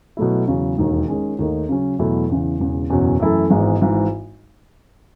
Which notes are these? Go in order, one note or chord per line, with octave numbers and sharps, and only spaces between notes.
B2 F#3 A3 E4
E2 C#3 F#3
E1 D#2 D#3
D#3 G#3 C#4
D#2 D#3 A3 D#4
C#3 F#3 C#4
E2 B2 F#3 A3 E4
E2 C#3 E3
E1 E2 C#3
F#1 E2 B2 F#3 C#4
F#2 E3 A3 E4 A4
G#1 G#2 E3 G#3 B3
G#1 G#2 E3